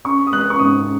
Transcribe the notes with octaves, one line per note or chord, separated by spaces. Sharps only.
C#4 C#6
D#6
G#3 F#6
C#6
G#2 D#6